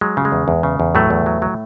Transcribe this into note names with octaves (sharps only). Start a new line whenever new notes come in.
F#3 G#3
C#3
G#3
E2
E2
C#3
E2
A2 F#3 A3
E2
F#3
F#3